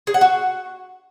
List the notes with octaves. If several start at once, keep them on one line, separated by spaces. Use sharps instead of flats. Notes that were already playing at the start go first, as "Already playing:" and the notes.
G#4
F#5
F#4